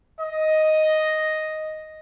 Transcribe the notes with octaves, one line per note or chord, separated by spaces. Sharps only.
D#5